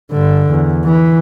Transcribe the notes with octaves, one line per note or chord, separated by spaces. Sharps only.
G2 D3
E2
E3